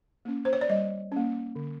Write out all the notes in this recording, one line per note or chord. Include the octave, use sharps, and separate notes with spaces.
A#3 C#4
C5
C#5
D5
G3 D#5
A#3 C#4
D3